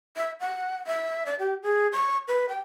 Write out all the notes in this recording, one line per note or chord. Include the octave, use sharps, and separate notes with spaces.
E5
F#5
E5
D5
G4
G#4
C#6
B4
G5